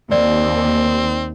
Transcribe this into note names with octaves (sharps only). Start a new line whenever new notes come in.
D#2 C4 D5